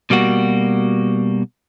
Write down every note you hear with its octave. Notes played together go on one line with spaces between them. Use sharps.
B2 G3 A#3 F#4